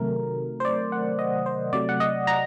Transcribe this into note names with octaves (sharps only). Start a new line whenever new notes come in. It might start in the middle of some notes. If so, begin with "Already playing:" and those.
Already playing: C3 D#3 F#3 A3 A#4
C5
D5
F#5
D#5
C5
C3 F#3 A3 D5
F#5
D#5
A#5